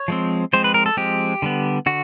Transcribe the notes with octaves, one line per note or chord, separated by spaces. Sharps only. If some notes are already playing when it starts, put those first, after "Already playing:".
Already playing: C#5
F3 G#3 C4
F3 G#3 C4 C5
B4
A#4
A4
F3 G#3 C4 G4
D3 G3 B3
D3 F#4